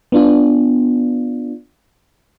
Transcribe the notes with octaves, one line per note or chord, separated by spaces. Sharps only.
B3 D4 F4